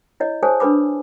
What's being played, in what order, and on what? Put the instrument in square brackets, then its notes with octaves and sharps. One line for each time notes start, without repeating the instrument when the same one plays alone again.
[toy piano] E4 C#5 D#5
G#4 A4 C5 C#5 G#5 A5
D4 A4 B4 B5 D6